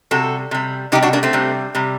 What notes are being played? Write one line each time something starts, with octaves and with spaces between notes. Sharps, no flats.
C3 G3 F#4 A4
C3 G3
C3 G3 D#4 G4
D4 F#4
A#3 D4
A3 C4
C3 G3
C3 G3